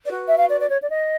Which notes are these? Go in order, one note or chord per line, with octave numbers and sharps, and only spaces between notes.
F#4 B4 D5
E5
F5
D5
D5
C#5
D5
D#5